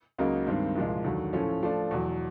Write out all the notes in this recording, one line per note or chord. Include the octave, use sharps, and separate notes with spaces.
C#2 C#3 F#3 A#3 D#4
G2 D#3 G#3 C4
C2 A#2 F3 G#3
D#2 D3 F#3
A2 F3 A3 C#4
F3 A3 D4
E2 B2 F#3